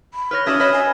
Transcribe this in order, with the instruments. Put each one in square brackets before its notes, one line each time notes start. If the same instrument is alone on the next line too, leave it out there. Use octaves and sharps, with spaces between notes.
[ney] B5
[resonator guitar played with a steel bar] B4 C#5 [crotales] F6 A#6
[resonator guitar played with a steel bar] A3 F#4 D5 [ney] C#4 [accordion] E5 D#6 [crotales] G#6
[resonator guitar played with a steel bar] B4 D#5 [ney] C#5
[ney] G#5